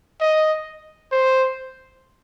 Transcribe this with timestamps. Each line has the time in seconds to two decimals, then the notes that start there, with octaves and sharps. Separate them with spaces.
0.21 D#5
1.12 C5